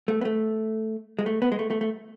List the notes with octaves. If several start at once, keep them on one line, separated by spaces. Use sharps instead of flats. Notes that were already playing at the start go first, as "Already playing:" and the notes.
A3
B3
A3
G#3
A3
B3
G#3
A3
A3
A3